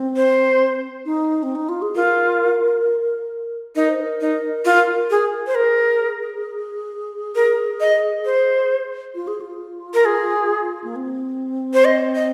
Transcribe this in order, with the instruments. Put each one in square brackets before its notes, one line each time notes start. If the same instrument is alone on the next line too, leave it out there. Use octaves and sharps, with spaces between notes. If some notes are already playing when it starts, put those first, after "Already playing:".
Already playing: [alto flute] C4
[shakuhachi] C5
[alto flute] D#4
C4
D#4
F4
G#4
[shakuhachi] F4 [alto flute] A#4
[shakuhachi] D#4 [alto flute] A#4
[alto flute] C5
A#4
[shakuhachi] D#4
F4
G#4
C5
[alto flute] G#4 [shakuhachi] A#4
[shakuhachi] A#4
D#5
C5
[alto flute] F4
G#4
F4
[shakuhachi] A#4
G#4
[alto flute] A#3
C4
[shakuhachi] C5
D#5
D#5